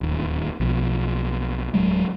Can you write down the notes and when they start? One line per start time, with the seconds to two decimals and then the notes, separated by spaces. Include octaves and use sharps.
0.01 D1 D#2
0.60 B1 F3
1.74 D1 D#2 F#3 G#3